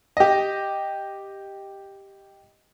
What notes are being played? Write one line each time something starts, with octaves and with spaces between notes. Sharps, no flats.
G4 D#5